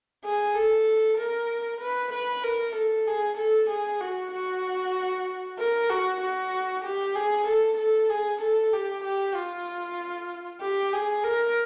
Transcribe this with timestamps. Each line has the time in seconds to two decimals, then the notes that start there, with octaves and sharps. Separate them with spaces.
0.24 G#4
0.55 A4
1.18 A#4
1.81 B4
2.13 B4
2.44 A#4
2.76 A4
3.07 G#4
3.38 A4
3.70 G#4
4.01 F#4
4.33 F#4
5.59 A#4
5.90 F#4
6.21 F#4
6.85 G4
7.15 G#4
7.48 A4
7.78 A4
8.10 G#4
8.42 A4
8.73 G4
9.04 G4
9.36 F4
10.61 G4
10.93 G#4
11.24 A#4